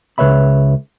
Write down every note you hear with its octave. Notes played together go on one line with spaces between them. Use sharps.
C#2 B4 C#5 E5 B5